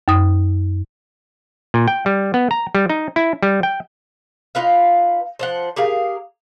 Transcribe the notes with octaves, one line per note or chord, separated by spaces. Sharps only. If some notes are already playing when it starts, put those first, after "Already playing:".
F#2 D#6
A#2
G5
G3
B3
A#5
G3
D#4
E4
G3
G5
D#4 F4 B4 F5
F3 C5 F#5
G4 G#4 A#4 F5